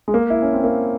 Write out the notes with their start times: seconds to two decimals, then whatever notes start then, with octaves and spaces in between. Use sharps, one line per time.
0.08 G#3
0.14 A#3
0.30 E4
0.42 C#4
0.53 C4
0.64 A#3